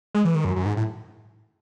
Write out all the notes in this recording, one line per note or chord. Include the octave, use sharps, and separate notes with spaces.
G#3
E3
D#3
F#2
F#2
G#2
A2